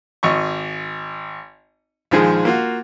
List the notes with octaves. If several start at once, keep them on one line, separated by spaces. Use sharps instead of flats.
G#1 D#5 C#6
A#1 D#3 F3 G#3 G#4
A#3 F4 F#4